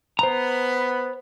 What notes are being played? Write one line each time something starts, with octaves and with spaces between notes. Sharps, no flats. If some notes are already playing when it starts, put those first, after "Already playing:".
B3 C5 A#5 B5